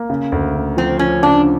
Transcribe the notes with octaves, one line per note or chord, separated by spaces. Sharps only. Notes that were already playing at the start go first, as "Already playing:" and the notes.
Already playing: A#3
C#3
D2
C#3
F3 C4
F3 C#4
C#3 D4